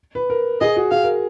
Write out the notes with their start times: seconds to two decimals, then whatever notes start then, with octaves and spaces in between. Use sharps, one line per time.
0.15 B4
0.30 A#4
0.61 G#4 D#5
0.76 F#4
0.91 G#4 F5
1.03 A#4